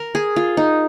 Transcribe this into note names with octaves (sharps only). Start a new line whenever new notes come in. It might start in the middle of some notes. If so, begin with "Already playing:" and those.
Already playing: A#4
G#4
F4
D#4